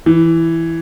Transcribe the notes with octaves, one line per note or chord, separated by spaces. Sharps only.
E3